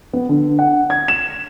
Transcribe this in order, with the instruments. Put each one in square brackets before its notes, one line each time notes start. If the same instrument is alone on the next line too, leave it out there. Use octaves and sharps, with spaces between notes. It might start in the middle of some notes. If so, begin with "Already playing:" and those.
[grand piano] B3
D3
F#5
G#6
E7